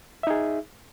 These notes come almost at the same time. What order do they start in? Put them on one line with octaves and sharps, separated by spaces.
E5 D#4 G#4